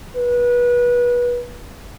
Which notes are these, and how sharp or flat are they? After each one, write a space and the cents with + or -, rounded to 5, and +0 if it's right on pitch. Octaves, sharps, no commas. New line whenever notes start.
B4 -25